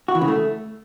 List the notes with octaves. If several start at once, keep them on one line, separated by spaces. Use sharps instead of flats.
F#4
E3
C#3
A3